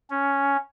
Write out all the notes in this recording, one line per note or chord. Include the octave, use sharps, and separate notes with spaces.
C#4